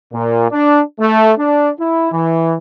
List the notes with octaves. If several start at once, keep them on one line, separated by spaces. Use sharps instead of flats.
A#2
D4
A3
D4
E4
E3